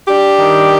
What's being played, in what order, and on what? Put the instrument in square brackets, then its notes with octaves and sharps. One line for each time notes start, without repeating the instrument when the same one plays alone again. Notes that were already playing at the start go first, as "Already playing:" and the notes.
[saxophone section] D4 G4
D#3